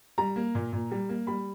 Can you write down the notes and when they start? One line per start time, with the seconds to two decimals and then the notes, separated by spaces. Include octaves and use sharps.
0.18 G3 A#5
0.36 A#3
0.55 A#2
0.73 A#2
0.91 G3
1.09 A#3
1.27 G3 B5